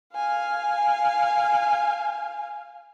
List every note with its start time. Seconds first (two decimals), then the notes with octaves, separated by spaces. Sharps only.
0.14 F5 G#5